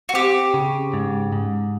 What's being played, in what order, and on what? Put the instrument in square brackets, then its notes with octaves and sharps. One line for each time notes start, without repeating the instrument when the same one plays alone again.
[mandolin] F#4
[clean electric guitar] C4 [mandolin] G4
[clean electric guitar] C#3
G#2
G#2